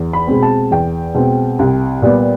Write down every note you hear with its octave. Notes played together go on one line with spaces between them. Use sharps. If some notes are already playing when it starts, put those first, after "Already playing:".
Already playing: E2
B5
B2 G#3 C4
A5
E2 G5
B2 G#3 C4
C2
A#2 G3 B3